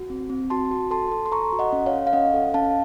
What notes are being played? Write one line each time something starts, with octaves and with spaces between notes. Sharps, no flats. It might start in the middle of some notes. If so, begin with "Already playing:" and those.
Already playing: F#4
C4
C4
F#4 A5 C6
F#4
A4 A5 C6
A4
C6
A4 A#5 C#6
F#4
D#5 F#5
C#4
C#5 F5
A4
F5
C#4 D#5 F#5
A4
C#4 F5 A5